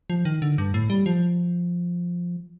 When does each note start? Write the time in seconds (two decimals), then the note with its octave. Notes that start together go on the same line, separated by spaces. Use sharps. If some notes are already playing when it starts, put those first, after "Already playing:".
0.10 F3
0.25 D#3
0.42 D3
0.58 G2
0.74 A2
0.90 G3
1.06 F3